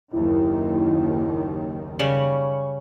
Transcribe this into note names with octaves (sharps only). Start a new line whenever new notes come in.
F#1 D#2 D#3 E4
C#3 G3 C#4 C#6